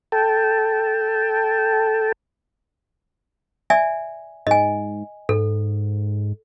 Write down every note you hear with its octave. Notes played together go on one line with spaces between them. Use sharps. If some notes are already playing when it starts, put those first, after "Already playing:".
A4 G5 A5
D5 E5 G#5
G#2 D#5 G#5
G#2 A4